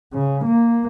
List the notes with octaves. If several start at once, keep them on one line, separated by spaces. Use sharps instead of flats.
C#3
A#3